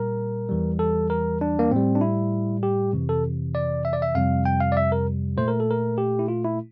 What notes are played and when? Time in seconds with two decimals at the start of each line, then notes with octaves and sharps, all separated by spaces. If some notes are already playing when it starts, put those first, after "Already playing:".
Already playing: A#2 G3 A#4
0.49 E2 E3 G3
0.79 A4
1.10 A#4
1.41 D4
1.59 A#3
1.71 A2 G3 C4
1.95 D4
2.01 E4
2.63 G4
2.93 F2 C3 E3
3.09 A4
3.55 D5
3.85 E5
3.93 D5
4.02 E5
4.15 F2 C3 G3 F5
4.45 G5
4.60 F5
4.72 D5
4.77 E5
4.92 A#4
5.37 A#2 A3 C5
5.48 A#4
5.60 A4
5.71 A#4
5.98 G4
6.19 E4
6.28 F4
6.44 E4